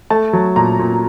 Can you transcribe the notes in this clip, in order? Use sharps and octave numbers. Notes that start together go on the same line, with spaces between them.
A3 A5
F#3
A#2 A#5
A#2